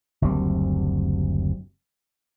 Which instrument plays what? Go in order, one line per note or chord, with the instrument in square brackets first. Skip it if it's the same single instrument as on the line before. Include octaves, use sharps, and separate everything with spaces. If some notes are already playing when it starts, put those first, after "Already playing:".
[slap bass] F#1 D2 G3 C4